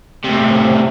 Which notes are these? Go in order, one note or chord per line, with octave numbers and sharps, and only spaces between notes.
A2 C3